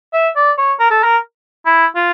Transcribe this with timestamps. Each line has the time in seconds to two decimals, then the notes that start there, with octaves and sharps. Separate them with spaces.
0.13 E5
0.36 D5
0.58 C#5
0.80 A#4
0.91 A4
1.04 A#4
1.66 E4
1.95 F4